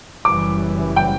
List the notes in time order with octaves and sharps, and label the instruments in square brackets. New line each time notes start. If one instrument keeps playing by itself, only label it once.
[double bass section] F#1 F#2 E3 G3 [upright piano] D6
[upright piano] G5